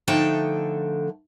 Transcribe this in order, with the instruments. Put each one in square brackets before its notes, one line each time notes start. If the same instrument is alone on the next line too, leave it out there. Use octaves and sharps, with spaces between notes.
[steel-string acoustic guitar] D3 F3 A3 D#4 G5 A5